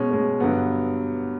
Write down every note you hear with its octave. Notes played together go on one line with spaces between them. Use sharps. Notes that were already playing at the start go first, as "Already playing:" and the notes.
Already playing: B2 G#3 C#4
B2 G#3 C#4
G2 D3 F#3 B3